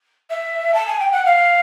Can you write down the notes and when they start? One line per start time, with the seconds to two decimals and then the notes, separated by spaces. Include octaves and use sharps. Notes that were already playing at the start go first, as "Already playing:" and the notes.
0.30 E5
0.74 A5
0.87 G#5
1.00 G5
1.12 F#5
1.25 F5